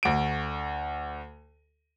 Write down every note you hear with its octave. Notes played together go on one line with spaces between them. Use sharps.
D2 D7